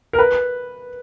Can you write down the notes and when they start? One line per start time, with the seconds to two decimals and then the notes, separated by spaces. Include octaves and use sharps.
0.13 A#4
0.19 B4